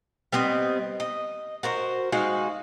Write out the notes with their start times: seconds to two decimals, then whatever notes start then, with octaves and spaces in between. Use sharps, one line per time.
0.32 G3 B3 C4 D#5
1.00 D#5
1.63 F#4 A#4 C5
2.12 G#3 D#4 F#4 F5